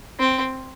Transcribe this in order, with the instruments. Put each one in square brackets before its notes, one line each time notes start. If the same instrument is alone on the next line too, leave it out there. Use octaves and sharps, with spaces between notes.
[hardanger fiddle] C4